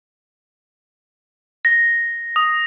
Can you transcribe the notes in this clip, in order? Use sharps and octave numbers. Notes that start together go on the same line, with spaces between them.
A#6
D#6